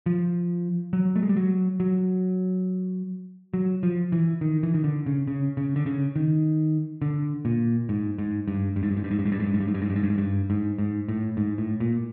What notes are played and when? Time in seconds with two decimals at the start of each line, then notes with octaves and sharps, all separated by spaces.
0.06 F3
0.93 F#3
1.16 A3
1.23 G#3
1.29 G3
1.37 F#3
1.80 F#3
3.54 F#3
3.83 F3
4.12 E3
4.41 D#3
4.63 E3
4.74 D#3
4.84 D3
5.06 C#3
5.28 C#3
5.57 C#3
5.76 D3
5.86 C#3
6.16 D#3
7.02 D3
7.45 A#2
7.89 G#2
8.18 G#2
8.48 G2
8.76 G2
8.83 G#2
8.91 G2
8.97 G#2
9.04 G2
9.11 G#2
9.19 G2
9.26 G#2
9.32 G2
9.40 G#2
9.47 G2
9.54 G#2
9.61 G2
9.68 G#2
9.74 G2
9.82 G#2
9.90 G2
9.96 G#2
10.03 G2
10.10 G#2
10.18 G2
10.50 G#2
10.79 G#2
11.09 A2
11.37 G#2
11.58 A2
11.80 A#2